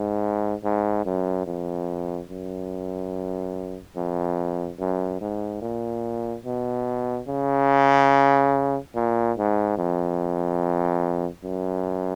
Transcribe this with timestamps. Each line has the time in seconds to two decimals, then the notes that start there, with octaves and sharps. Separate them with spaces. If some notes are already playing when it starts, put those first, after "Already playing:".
Already playing: G#2
0.64 G#2
1.05 F#2
1.46 F2
2.29 F#2
3.96 F2
4.79 F#2
5.21 G#2
5.62 A#2
6.45 B2
7.28 C#3
8.95 A#2
9.37 G#2
9.78 F2
11.44 F#2